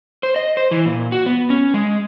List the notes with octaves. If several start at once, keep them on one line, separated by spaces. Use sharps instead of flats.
C5
D#5
C5
E3
A#2
F#4
B3
C#4
G#3